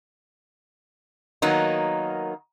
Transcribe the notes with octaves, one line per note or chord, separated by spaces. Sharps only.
D#3 F#3 A#3 B3 D#4